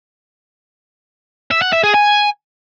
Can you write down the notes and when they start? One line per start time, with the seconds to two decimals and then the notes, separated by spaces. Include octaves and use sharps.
1.51 E5
1.62 F#5
1.73 E5
1.83 G#4
1.94 G#5